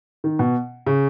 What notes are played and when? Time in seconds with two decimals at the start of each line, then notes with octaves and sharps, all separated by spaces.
0.24 D#3
0.39 B2
0.86 C#3